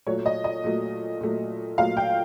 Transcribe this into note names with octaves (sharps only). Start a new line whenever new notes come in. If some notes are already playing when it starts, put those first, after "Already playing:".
A#2 F#3 A3 C#5
D#5
D#5
A#2 F#3 A3
A#2 F#3 A3
A#2 F#3 A3 F5
G5